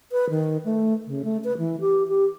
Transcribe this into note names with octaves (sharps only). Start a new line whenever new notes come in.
B4
D#3
A3
C#3
A3
B4
E3
G4
G4